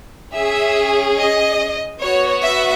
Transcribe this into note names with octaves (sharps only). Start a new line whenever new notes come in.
C#4 G#4 E5
D#5
B3 F#4 C#5
E5